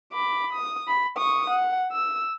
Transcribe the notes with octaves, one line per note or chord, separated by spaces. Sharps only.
B5 D6
D#6
B5
C#6 D#6
F#5
E6